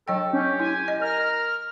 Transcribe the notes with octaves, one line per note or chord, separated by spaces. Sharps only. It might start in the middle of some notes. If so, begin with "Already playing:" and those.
F#3 A4 D#5 G5
C#4 G4
E4 G#5
D#5
A#4 F6